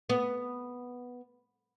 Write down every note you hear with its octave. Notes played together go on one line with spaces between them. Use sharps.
B3